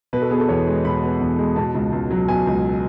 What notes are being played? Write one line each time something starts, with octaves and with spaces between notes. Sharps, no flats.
B2 B4
A4
B3 G#4
A4
E2 C#5
G#3
B2 B5
B3
E2
G#3
B2 A5
C#2
C#2
F#3
B2 G#5
C#2